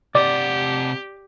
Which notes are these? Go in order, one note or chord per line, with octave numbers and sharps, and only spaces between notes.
C3 G4 D5 F#5